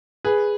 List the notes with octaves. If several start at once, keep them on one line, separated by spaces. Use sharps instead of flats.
G#4 B4